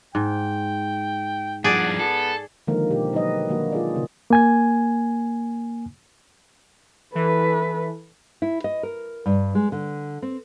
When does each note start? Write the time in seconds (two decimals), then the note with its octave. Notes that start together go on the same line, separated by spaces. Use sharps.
0.15 G#2 G5
1.64 G2 F3 G#4 D5 F#5
1.99 B3 A4
2.67 D3 D#3 F3 G#3 A#3 A#4
2.90 B2 G4
3.13 F#3 D#4 A#4 B4 D#5
3.49 D#3 F#3 A#3 D4 F#4
3.72 F4 G#4 D5
3.94 A#2 C#3 A#3
4.30 A#3 G#5 G#6
7.15 E3 A4 B4
8.42 E4
8.64 D#5
8.83 A#4
9.26 G2
9.55 G#3
9.72 D3
10.22 C4